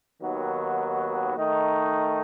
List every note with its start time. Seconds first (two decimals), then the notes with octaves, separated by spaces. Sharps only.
0.21 D#2 D#3 F#3 B3 F#4
1.35 D#3 A3 D#4